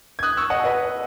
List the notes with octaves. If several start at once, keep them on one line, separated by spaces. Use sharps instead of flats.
G#6
D#6 F#6
C#6 E6
D#5 F#5
B4 D#5